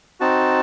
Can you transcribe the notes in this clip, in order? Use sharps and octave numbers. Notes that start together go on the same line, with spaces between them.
C4 D#4 F#4 A5